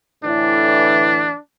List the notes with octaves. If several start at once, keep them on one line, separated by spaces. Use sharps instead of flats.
A2 D3 E3 D4